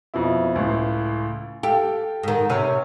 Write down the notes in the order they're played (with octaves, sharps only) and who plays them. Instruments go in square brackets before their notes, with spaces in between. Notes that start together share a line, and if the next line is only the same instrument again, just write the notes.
[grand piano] F2 B2 E4
C#2 A2
[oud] G4 [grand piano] A4 F5 G5
[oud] G#2 D#3
C3 C#4 B4